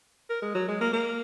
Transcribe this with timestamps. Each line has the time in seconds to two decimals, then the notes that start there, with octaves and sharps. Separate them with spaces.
0.30 A#4
0.42 G#3
0.54 F#3
0.68 G#3
0.81 A#3
0.93 A#3